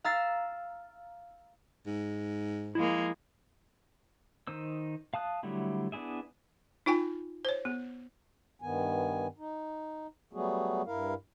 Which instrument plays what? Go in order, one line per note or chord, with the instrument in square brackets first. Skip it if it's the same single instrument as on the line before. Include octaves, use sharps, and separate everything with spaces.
[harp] F5 A#5 E6 A6 C7
[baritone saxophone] G#2
[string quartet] F3 G#3 A#3 [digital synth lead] E4
[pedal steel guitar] D#3 D#4 C5 E6
F5 A5 D#6 F#6
D3 F#3 G3 A3 E4
B3 D4 E4 G#4 E5
[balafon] D#4 F4 G5 G#5
C5 C#5
B3
[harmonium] G2 D#3 B3 G#5
D#4
F#3 G3 A3 B3 F#4 G#4
G2 E4 A#4 F5